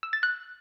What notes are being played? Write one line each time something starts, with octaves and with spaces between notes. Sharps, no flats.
E6
A6
F#6